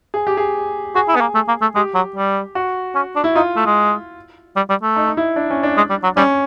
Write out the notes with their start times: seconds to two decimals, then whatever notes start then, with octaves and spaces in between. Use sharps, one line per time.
0.14 G#4
0.27 G4
0.37 G#4
0.95 F#4 G#4
1.09 E4
1.15 B3
1.21 A#3
1.35 A3
1.48 A#3
1.62 A3
1.76 G#3 G4
1.95 F#3
2.16 G3
2.55 F#4
2.95 C#4
3.16 D4
3.24 E4
3.35 D#4 F4
3.57 A3
3.66 G#3
4.56 G3
4.70 G3
4.83 A3
4.96 D#4
5.07 D#4
5.17 E4
5.36 D4
5.50 C#4
5.63 D4
5.77 G#3
5.90 G3
6.03 F#3
6.17 G3 C#4